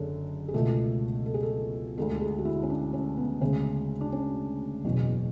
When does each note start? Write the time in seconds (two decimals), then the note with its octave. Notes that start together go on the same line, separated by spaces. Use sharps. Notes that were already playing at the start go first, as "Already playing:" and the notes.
Already playing: F#1 F#2 D3 G#4 A4
0.48 G#4
0.54 C#2 B2 A3 A4
1.26 A4
1.34 G#4
1.43 A4
1.98 D2 D3 G#3 A4
2.10 A4
2.21 G#4
2.39 F#4
2.45 E4
2.63 C#4
2.70 D4
2.93 C#4
3.17 B3
3.41 D2 C#3 G#3 C#4
4.01 D4
4.13 C#4
4.85 F#1 E2 B2